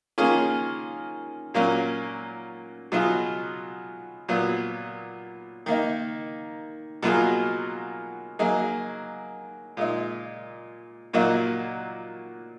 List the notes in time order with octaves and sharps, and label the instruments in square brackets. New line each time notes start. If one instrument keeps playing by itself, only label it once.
[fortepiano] D#3 A#3 C#4 F4 G#4
A#2 F#3 A#3 C#4
B2 F#3 B3 F4 G#4
A#2 F#3 B3
D#3 A#3 D#4
B2 F#3 A#3 F4 G#4
F#3 A#3 D#4 G#4
A#2 G#3 D#4
A#2 F#3 A#3 D#4 F#4